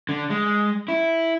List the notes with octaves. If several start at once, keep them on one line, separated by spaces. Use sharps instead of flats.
D3
G#3
E4